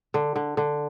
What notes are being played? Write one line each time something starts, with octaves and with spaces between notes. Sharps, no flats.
D3
D3
D3